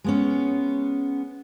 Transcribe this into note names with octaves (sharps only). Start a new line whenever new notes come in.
G#3 B3 C#4